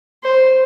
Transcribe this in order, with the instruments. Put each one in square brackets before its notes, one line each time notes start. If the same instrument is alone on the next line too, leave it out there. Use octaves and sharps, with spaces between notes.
[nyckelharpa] C5